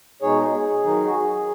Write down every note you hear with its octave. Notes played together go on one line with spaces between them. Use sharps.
B2 G#3 D#4 G#4 C#5
G#4
D#3 F#3 D#4
F#4
G#4